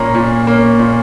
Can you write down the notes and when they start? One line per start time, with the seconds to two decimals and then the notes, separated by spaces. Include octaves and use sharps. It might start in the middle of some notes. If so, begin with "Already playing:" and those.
Already playing: A#2 A#3 C#4 A#5
0.15 A#2
0.47 A#3 C#4
0.79 A#2